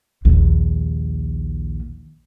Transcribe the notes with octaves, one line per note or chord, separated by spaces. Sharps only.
A#1 D#2